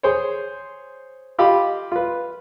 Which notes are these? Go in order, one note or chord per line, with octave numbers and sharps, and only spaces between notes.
G#4 C5 C#5
F4 G4 D#5 F5 B5
F4 B4